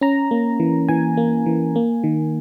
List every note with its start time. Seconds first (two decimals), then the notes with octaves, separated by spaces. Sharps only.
0.01 C#4 A#5
0.31 A#3
0.60 E3
0.89 E3 G#5
1.17 A#3
1.46 E3
1.76 A#3
2.04 D#3